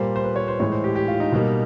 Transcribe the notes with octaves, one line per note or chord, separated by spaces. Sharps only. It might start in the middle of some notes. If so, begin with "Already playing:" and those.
Already playing: A#2 G3 A#3 C5
C5
B4
C#5
C5
A2 E3 G#3 C#5
C5
G4
G4
F4
D#4
B2 G3 A#3